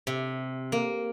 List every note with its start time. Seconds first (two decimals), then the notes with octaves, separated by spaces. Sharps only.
0.07 C3
0.72 A#3